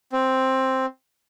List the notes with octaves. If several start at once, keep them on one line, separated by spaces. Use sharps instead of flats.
C4